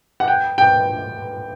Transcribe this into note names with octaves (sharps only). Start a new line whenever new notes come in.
F#5
G5
G5